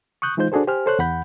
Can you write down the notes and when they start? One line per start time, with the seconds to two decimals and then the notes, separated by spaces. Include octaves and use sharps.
0.22 C#6 D#6 F#6 G6
0.37 E3 G#3 D#4 F4 C5 G6
0.52 D4 F#4 G#4 A4 C5
0.67 G4 C5 G#5 F6
0.86 A4 C5 C#5 F#6
0.99 E2 F#5 B5 G6